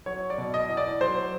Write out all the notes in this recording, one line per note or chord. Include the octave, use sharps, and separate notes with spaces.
F#3 C#5
D5
B2
D#5
E2
D5
F#3 C5